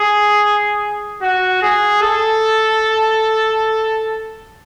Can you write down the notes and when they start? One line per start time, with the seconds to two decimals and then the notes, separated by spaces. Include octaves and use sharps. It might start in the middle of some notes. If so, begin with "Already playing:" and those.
Already playing: G#4
1.22 F#4
1.62 G#4
2.02 A4